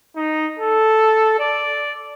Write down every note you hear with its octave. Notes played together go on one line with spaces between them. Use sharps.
D#4
A4
D5